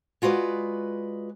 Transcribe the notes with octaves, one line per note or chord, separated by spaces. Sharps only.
G#3 F4 F#4 B4 D5